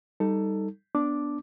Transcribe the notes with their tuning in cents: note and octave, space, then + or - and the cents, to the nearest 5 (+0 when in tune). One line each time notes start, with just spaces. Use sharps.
G3 +0 D#4 +0 A4 +15
B3 +0 D4 -5 D6 +0